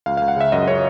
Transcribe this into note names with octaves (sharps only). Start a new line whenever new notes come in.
C#2 F5
C#2 F5
F#5
C#3 E5
F#2 D#5
C#3 C#5